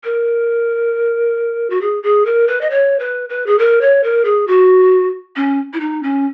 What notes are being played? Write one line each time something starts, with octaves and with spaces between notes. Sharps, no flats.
A#4
F#4
G#4
G#4
A#4
B4
D#5
C#5
B4
B4
G#4
A#4
C#5
A#4
G#4
F#4
C#4
E4
D#4
C#4